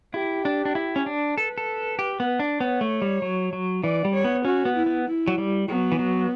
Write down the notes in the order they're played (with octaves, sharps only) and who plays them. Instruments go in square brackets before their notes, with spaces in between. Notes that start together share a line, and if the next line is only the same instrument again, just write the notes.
[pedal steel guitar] E4 [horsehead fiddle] G4
[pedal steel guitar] D4
D4
E4
C#4
D4
[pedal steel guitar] A4 [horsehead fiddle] B4
[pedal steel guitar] A4
G4
B3
D4
[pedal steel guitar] B3 [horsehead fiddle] C#5
[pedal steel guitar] A3
G3
F#3
F#3
[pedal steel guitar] E3 [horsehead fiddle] D5
[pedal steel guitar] G3
[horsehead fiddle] C#5
[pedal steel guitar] B3
[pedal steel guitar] C#4 [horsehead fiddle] F#4
[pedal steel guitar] B3
[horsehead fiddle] E4
[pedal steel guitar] B3
[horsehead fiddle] E4
[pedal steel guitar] F#3
G3
[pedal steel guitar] F#3 [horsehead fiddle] B3
[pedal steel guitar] E3
F#3